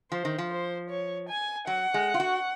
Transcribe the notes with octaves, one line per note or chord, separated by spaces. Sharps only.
F3 C5
D#3
F3
C5
C#5
G#5
F#3 F#5
G#3
F4
F#4